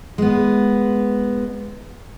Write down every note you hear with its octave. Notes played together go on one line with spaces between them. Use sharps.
G#3 B3